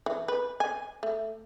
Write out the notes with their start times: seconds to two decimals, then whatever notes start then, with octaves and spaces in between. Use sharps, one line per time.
0.06 E3
0.28 B4
0.60 G#5
1.03 A3